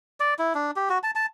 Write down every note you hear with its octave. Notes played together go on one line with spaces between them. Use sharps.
D5
E4
D4
G4
F#4
A5
A5